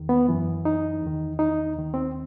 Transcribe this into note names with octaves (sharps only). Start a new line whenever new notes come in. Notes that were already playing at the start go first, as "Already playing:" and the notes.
Already playing: E2 D#3
B3
F#2 E3
D#4
E2 D#3
D#4
D#2 D#3
C4